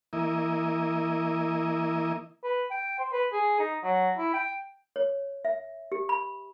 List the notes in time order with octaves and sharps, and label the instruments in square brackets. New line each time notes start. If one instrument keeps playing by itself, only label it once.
[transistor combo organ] E3 A#3 E4 D#5
[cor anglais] B4
G5
C5
B4
G#4
D#4
F#3
E4
G5
[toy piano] C#5
E5
G4
B5